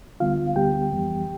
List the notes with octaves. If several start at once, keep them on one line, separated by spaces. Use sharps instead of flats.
D2 D3 G3 B3 F4 F5
D2 D3 G3 B3 G4 G5
F2 E3 G3 B3